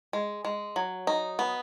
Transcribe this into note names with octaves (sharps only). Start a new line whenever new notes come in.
G#3
G#3
F#3
D#4
B3